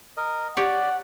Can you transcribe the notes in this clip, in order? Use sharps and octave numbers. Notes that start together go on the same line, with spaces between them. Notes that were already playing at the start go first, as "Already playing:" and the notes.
A#4 D#5
G4 C#5 D5 F#5